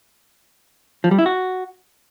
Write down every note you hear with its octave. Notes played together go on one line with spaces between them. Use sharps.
F3
G3
E4
F#4